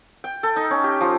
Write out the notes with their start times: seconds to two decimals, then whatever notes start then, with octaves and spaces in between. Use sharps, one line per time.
0.24 G5
0.43 A4
0.56 D#4
0.71 C#4
0.84 G4
1.01 F3